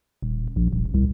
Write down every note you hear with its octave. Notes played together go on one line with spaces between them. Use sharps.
D#1
A#1
D#1
C2